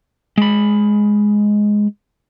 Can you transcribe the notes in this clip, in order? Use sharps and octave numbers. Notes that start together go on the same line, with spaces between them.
G#3 B5